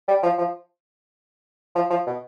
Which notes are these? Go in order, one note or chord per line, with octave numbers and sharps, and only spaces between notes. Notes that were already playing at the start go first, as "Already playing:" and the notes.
G3
F3
F3
F3
F3
B2